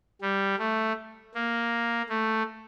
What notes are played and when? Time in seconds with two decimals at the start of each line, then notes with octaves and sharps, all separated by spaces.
0.21 G3
0.59 A3
1.35 A#3
2.09 A3